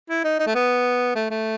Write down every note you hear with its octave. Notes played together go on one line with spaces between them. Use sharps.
E4
D#4
D#4
A3
B3
A3
A3